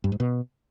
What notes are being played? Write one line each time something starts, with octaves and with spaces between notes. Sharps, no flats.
G2
G#2
B2